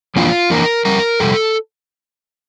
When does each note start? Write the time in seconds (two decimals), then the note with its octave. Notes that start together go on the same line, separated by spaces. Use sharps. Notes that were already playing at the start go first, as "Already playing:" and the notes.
0.16 F2 E3 A#3 D4 F4
0.50 F2 E3 A#3 D4 A#4
0.85 F2 C3 G3 A#4
1.20 F2 C3 G3 A4